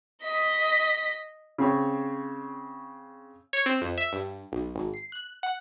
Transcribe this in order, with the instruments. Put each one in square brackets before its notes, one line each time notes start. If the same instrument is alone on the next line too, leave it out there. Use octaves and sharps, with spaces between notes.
[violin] D#5 B6
[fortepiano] C#3 C4 C#5
[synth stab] C#5
C4
F2
E5
G2
B1
G#1
C7
F#6
F#5